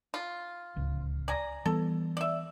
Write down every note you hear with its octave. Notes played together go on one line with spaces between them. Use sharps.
F4
D1 C#2
D5 G#5 A#5
E3 G3 B3 A4
D5 E5